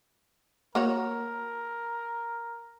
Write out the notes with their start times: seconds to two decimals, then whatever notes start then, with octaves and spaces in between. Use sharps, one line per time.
0.75 A#3 F#4 A#4 C#5